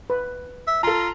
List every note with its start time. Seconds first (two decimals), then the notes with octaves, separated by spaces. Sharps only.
0.10 B4
0.67 E5
0.83 F4 A4 A#5